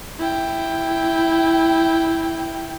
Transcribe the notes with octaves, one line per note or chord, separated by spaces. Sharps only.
E4 G5